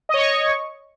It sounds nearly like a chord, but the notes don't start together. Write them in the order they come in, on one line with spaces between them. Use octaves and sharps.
D#5 C#5 C#6